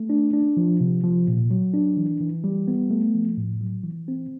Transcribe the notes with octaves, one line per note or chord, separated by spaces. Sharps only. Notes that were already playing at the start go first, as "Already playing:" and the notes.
Already playing: A3
D4
D4
F3
C3
F3
A#2
F#3
D4
E3
E3
G3
B3
A3
F3
A2
F#3
E3
C4